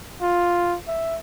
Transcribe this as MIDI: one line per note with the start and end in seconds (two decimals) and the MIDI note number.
0.21 0.77 65
0.87 1.17 76